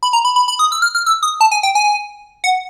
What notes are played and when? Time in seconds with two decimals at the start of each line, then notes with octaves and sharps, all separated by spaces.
0.03 B5
0.13 A#5
0.25 B5
0.36 B5
0.48 B5
0.59 D#6
0.72 E6
0.82 F6
0.95 F6
1.06 E6
1.23 D#6
1.41 A5
1.51 G#5
1.63 G5
1.75 G#5
2.44 F#5